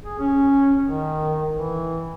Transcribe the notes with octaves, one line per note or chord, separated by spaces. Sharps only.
G#4
C#4
D#3
E3